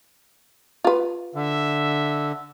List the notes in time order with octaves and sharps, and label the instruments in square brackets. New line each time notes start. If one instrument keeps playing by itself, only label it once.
[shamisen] F4 B4
[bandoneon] D3 [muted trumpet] E5